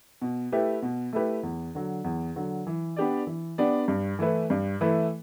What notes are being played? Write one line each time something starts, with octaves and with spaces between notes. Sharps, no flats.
B2
A3 E4 G4 B4
B2
A3 E4 G4 B4
E2
D3 F#3
E2
D3 F#3
E3
B3 D4 G4 D5
E3
B3 D4 G4 D5
G2
E3 A3 E4 B4
G2
E3 A3 E4 B4